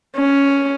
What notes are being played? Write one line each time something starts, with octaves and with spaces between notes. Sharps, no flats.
C#4